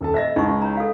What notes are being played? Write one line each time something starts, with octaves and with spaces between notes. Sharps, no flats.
D#1 A4 A5
C5 D#5 E5 A#6
C#2 D#4 E4 C#6
C#5 A#5
A4 F5